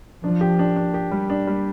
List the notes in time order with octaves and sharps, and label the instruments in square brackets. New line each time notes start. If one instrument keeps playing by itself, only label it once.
[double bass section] F3 [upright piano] D4
[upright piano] G4
D4
D4
G4
G3
D4
G3